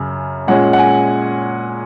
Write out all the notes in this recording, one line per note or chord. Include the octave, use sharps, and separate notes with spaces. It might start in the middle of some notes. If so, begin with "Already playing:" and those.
Already playing: F#2 C#3
A#2 G#3 C#4 F#5
F#5
G#5